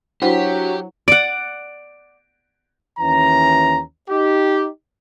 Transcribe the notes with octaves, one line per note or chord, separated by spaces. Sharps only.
F#3 D4 E4 F#4 G4 C5 F#5 B6
D5 F#5 D7
D#2 E3 C#4 A#5
D#4 G4